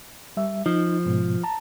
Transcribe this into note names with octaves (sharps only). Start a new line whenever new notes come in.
G3 E5
F3 D#4
G#2 B2
A5 A#5